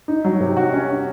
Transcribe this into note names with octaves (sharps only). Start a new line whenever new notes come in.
D#4
F#3
C3
F#4
C#4
C#4